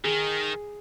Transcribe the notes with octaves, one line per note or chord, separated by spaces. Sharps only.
D#3 G#4